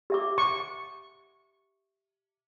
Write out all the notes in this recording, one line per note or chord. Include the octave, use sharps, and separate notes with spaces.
G4 E5 D6
C#6